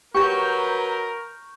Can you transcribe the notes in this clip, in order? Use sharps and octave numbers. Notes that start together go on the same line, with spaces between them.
F#3 G4 A#4 B4 C#6 G6